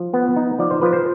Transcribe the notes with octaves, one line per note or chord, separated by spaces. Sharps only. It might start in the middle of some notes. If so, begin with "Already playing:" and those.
Already playing: F3
B3
D#4
F3 D5
C5
F3 B4
C5